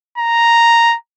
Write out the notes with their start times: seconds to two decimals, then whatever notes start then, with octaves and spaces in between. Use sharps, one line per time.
0.18 A#5